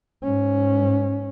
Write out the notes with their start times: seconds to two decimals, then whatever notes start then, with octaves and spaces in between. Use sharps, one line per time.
0.23 G#2 C#4